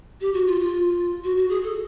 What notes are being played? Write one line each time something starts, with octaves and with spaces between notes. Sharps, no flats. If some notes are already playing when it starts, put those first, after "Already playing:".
G4
F#4
F4
F4
F#4
F#4
G#4
A4